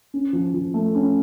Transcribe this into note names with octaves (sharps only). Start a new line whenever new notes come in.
C#4
F3
F3
A3
C#4